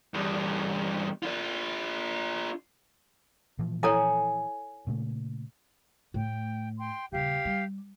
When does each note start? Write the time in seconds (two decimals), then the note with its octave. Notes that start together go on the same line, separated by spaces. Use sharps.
0.14 E2 G2
1.23 D4 F4
3.59 A#2 E3 F3
3.83 E4 A4 C#5 G#5
4.87 A#2 C#3 A3
6.14 A2 A3 G5
6.78 G5 C6
7.12 D#1 C#3 G4 F5
7.45 G3